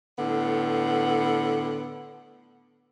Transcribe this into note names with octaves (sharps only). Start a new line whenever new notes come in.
A2 D3 B3